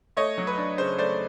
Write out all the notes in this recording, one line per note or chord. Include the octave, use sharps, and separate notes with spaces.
A3 C#5 D#5
F#3
B4
D4
C#3 C5
A3 C5 D5